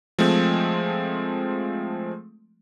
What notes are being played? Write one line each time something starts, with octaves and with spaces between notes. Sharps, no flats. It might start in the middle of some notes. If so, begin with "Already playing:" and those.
F3 G#3 A3 C4